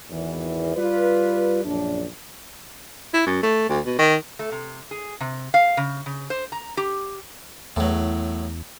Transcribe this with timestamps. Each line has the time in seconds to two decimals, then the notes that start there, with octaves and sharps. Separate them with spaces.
0.10 G#1 E2 E3
0.76 G3 F4 B4 D5
1.65 A#1 F#2 D4
3.14 E4
3.26 F#2
3.43 A3
3.69 D2
3.86 B2
3.99 D#3
4.39 A3
4.52 C3
4.91 G#4
5.21 C3
5.54 F5
5.77 C#3
6.06 C#3
6.30 C5
6.52 A#5
6.77 G4
7.76 E2 A2 F#3